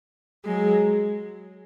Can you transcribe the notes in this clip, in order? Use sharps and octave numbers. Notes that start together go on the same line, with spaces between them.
F#3 G#3